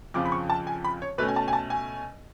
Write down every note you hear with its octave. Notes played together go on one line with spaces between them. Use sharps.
F2 C#3 F3 D6
B5
C#6
A5
G#5
B5
C#5
B2 A3 C#4 B4
G#5
A5
G#5
A5
G#5